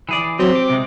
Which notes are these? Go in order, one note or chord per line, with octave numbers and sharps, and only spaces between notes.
E3 G#4 D5
F#3 C4 G4
D6
C3 G#3